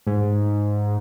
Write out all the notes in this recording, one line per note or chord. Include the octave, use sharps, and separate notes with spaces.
G#2